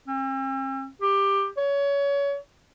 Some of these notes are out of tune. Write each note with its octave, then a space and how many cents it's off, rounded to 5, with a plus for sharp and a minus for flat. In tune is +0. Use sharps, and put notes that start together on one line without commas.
C4 +45
G4 +15
C#5 +25